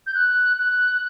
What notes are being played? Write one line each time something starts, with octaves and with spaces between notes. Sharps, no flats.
G6
F#6
F#6